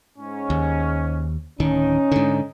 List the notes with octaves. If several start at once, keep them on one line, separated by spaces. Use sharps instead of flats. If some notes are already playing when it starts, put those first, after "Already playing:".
G#2 C#4
D#2
D1 D#3 C#4 D#4
G#2 D3